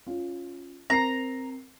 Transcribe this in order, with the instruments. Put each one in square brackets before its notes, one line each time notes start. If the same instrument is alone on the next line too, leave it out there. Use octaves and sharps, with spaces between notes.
[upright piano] C#4 F4
[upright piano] C4 A#4 C7 [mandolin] A#5